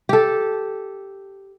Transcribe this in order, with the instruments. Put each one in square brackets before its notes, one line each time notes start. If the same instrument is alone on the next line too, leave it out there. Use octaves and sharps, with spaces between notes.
[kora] G4 A4